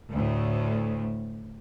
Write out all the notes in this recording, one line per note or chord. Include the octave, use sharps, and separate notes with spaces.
D2 A2